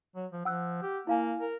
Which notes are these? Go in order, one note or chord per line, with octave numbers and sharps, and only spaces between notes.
F#3
F3
F3 F#5 E6 F#6
G4
A#3 E4 F5 G#5
A#4